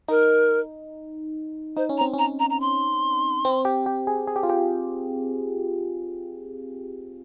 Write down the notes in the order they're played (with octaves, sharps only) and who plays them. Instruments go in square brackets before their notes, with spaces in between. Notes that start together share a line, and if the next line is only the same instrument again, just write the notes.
[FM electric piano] D#4 [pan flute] A#4
[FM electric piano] D#4 [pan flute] C5
[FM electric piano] C#4
[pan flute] A#5
[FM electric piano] C4
C#4
[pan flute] A#5
A#5
A#5
C6
[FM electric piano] C4
G4
G4
G#4
G#4
G4
F4
G4